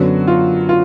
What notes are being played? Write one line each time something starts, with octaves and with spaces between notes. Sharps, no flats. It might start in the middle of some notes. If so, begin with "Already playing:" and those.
Already playing: F#2 D3 F#3 B3 F#4
F4
F4